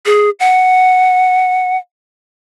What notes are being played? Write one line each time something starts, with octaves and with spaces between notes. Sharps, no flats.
G#4
F#5